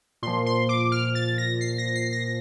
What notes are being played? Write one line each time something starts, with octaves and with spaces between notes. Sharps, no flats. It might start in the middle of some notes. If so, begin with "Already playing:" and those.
A#2 F3 C6
C6
D6
F6
A6
A#6
C7
A#6
C7
A#6